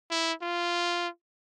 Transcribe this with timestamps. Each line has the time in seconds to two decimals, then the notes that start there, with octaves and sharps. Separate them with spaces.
0.11 E4
0.42 F4